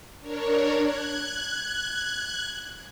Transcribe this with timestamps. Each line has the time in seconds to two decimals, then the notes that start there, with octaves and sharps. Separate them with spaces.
0.21 D4 A#4 C#5
0.74 F#6 G#6